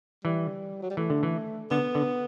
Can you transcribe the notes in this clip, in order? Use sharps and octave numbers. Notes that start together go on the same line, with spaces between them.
E3 G3
F#3
G3
E3 A3
D3
E3
D3 B3
D3